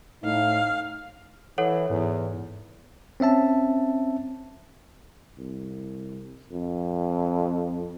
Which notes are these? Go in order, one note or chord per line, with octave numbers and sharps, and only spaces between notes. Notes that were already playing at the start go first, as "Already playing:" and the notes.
A2 D#4 F5
E3 A4 C#5 F#5
E2 G#2
C4 C#4 E5 A5
C2
F2